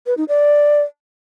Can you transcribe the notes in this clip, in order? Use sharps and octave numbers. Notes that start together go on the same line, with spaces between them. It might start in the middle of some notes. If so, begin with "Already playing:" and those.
B4
D#4
D5